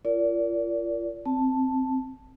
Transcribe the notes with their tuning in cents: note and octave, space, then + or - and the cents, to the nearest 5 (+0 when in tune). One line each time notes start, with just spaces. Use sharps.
F4 -35 A#4 +0 D5 -30
C4 +0 A5 +0